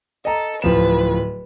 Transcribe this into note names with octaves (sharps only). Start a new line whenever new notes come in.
A4 D#5 A#5
D1 F3 B4 E7